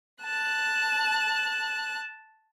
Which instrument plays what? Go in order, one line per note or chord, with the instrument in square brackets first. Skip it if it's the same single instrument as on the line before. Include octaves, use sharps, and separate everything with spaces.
[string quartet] A5 F#6